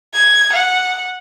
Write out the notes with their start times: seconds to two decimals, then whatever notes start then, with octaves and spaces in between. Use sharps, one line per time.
0.14 G#6
0.53 F#5